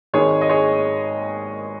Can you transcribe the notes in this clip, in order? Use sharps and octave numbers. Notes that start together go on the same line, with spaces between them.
G#1 G#2 D#3 G#3 G#4 C#5
D#5
G#4 C#5